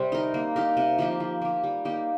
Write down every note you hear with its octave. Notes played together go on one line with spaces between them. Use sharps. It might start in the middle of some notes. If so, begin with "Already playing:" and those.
Already playing: C3 G3 C4
D#4 A#4
A#3
D#4 G4 A#4
C3
F3 A#3 G4
F3
A#3 G4
G3
A#3 D#4 G4